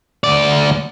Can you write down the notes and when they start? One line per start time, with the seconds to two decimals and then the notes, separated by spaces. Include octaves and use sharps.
0.24 D2 D5